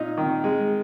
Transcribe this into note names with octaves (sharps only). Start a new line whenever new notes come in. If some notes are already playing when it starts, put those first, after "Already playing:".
Already playing: A#2 D#4
D#3
G#3